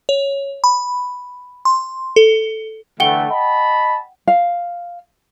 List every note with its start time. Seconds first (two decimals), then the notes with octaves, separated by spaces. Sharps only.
0.09 C#5
0.64 B5
1.65 C6
2.16 A4
3.00 D3 E3 A3 F#5 G5 G7
3.31 D#5 A5 B5
4.27 F5